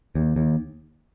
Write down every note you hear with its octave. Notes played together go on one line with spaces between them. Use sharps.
D#2
D#2